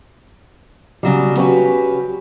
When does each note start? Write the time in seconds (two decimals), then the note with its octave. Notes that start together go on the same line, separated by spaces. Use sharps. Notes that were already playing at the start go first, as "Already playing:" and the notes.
1.03 C#3 F#3 G3
1.37 C#4 F#4 G4 B4